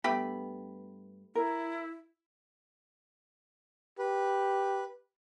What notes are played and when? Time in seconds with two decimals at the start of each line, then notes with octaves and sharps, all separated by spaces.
0.04 G2 A3 B3 G4 B5
1.35 E4 A#4
3.99 G4 B4